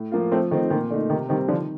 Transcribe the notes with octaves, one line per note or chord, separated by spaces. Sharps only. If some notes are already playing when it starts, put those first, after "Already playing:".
Already playing: A2
F3 A#3 F4
F3 A3 C4
D#3 A3 C4 D#4
A#2 D#3
D3 A3 D#4
C3 D#3
D#3 G3 C4
D3 D#3 F3